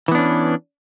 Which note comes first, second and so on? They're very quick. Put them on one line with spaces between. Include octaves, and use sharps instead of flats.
E3 B3 D4 C#4